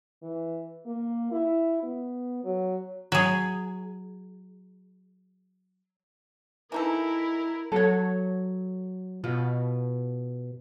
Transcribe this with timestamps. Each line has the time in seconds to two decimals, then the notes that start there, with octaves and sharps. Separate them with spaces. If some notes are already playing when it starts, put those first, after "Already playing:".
0.22 E3
0.86 A#3
1.31 E4
1.83 B3
2.44 F#3
3.12 F#3 G#4
6.72 E3 D#4 E4 A4 A#4
7.72 F#3 A4 C#5
9.24 B2 F4